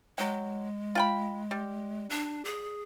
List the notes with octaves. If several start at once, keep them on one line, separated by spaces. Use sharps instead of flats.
F#3 G#3 G5
F4 G5 B5
G3
D4
G#4